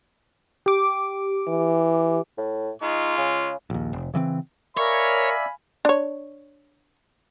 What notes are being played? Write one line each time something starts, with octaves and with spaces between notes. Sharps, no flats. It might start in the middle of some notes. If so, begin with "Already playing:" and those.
G4 D6
E3
A2
G#3 D#4 F4 C#6
C#3
A#1 D#2
F1
C#3 E3 G#3 C4
A#4 C#5 D5 E5 F5 G#5 B5
D4 C#5